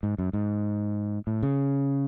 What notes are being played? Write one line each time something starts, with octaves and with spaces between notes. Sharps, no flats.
G#2
F#2
G#2
A2
C#3